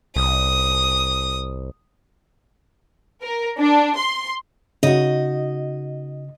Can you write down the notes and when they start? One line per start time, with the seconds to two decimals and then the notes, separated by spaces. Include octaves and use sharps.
0.16 C2 D#6
3.23 A#4
3.59 D4
3.97 C6
4.83 C#3 D#4 F#4 D#5